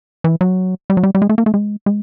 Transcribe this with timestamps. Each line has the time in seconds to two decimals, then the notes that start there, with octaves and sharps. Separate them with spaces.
0.24 E3
0.41 F#3
0.90 G3
0.97 F#3
1.03 G3
1.15 G3
1.22 G#3
1.29 A3
1.38 A#3
1.46 A3
1.54 G#3
1.86 G#3